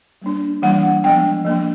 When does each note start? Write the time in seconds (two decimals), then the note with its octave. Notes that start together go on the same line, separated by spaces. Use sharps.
0.22 G3 A#3 D4
0.62 E3 G3 A#3 D4 F#5
1.04 F3 G#3 B3 D4 G5
1.45 F3 A#3 D4